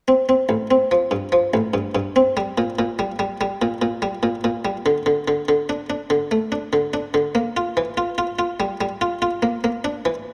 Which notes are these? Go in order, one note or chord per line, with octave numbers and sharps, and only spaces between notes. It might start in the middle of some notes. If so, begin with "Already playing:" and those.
C4
C4
A1
C4
F3
G2
F3
A1
G2
G2
C4
G3
A#2
A#2
G3
G3
G3
A#2
A#2
G3
A#2
A#2
G3
D3
D3
D3
D3
D4
D4
D3
A3
D4
D3
D4
D3
A#3
F4
E3
F4
F4
F4
G3
G3
F4
F4
A#3
A#3
D4
E3